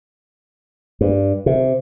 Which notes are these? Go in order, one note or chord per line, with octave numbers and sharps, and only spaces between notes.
G2
C3